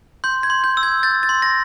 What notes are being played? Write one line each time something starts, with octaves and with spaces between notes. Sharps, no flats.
C6 G6
G#6
C6
G6
E6
G#6
G6 A6
A6
C6
A#6